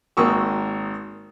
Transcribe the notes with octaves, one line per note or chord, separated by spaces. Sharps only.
G#1 A#3 F#4 C#6 D#6 E6